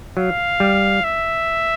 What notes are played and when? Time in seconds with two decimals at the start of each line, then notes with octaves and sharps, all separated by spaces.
0.17 F#3 F5
0.60 G3
1.04 E5